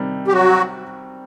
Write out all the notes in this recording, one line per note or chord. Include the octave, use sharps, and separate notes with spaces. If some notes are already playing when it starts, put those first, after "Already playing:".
Already playing: C3 D#3 G3
G4
F#3 F#4